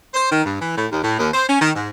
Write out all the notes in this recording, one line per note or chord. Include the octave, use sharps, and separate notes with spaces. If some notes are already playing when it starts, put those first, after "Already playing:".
C5
D#3
G2
E3
A2
D#2
A2
D#2
C5
C#4
D#3
G#2